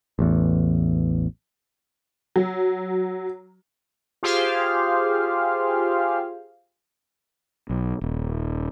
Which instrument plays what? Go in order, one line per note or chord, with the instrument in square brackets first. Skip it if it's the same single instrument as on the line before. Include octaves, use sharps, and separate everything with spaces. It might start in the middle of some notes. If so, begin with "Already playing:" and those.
[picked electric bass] A1 E2
[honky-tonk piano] F#3
[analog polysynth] F4 G4 G#4 C5 F5
[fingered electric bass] B1
D#1